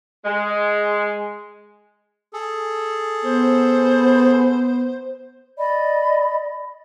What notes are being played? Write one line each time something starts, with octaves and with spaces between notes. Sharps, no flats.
G#3
G#4 A4
B3 C5
D5 D#5 B5